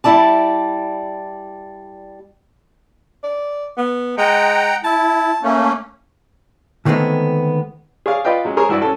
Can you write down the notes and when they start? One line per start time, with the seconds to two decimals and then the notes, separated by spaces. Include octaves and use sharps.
0.04 G3 E4 D5 A5
3.24 D5
3.77 B3
4.18 G#3 F#5 G5 A#5
4.84 E4 A5
5.43 A3 A#3 C#4
6.85 D3 D#3 G#3 A3 B3 C4
8.06 G#4 C#5 D5 F5
8.25 F4 B4 D5 D#5 F5 G5
8.45 F#3 G#3 C#4
8.57 G#4 A#4 C5 C#5
8.69 G2 E4 F#4 D5 E6
8.82 C#4 A4